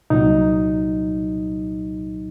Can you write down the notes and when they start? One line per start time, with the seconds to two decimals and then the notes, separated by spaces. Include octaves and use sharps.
0.10 C2 A#2 F#3 D#4